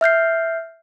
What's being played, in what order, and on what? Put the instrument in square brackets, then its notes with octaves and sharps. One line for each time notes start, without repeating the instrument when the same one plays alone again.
[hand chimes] E5 F6 G6 C7